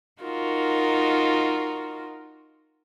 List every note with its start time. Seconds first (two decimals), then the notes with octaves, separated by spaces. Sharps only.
0.20 D#4 F4 F#4 A#4